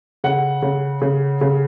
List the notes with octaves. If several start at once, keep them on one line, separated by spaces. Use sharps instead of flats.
C#3 F#5
C#3
C#3
C#3